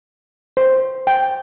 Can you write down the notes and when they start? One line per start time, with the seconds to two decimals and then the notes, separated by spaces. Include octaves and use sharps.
0.57 C5
1.07 G5